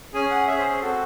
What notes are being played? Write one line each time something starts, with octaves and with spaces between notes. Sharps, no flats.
C#4 G#4 G#5
F#5
C#4 G#4 E5
C5
C5
C4 F#4 A4